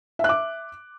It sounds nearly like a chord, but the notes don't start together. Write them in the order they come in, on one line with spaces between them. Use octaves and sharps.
E5 F#6 D6